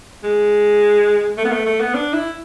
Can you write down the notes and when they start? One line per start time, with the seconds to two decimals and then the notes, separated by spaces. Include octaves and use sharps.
0.23 G#3
1.37 A3
1.45 B3
1.52 A3
1.66 A3
1.80 B3
1.94 D4
2.13 E4